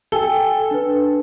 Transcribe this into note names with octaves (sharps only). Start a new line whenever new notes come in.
A4 G5 G#5 G7
D4 B4